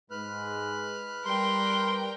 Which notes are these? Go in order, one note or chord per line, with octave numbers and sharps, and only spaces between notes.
G#2 G#3 B4 F6 F#6
G3 A#4 D5 G5 C6